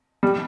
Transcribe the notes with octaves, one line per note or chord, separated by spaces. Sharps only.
G3